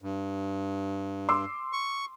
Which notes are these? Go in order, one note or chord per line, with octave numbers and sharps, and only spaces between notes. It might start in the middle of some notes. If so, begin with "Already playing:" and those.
G2
C6 D6 E6
C#6